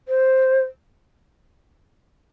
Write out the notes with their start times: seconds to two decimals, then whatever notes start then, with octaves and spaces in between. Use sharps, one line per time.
0.08 C5